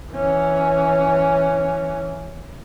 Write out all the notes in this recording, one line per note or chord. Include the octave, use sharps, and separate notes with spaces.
E3 C#4